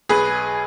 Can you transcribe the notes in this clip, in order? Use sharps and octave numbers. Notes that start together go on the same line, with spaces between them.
B1 G#4 B4